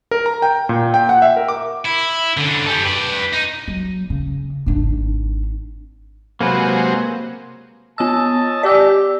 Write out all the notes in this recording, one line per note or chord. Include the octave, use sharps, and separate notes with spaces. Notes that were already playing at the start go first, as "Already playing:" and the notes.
A#4
A#5
G5
A#2
G5
F#5
E5
A#4
D6
E4
D3 C#4
G4 A4
B4 D5
D#4
F#3
C#3
G#1 D4
C3 F#3 G#3 A#3 B4 C5
B3 C#5 D#5 A5 E6
G4 D5 E6